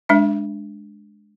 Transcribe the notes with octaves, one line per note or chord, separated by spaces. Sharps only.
G#3 D4 E5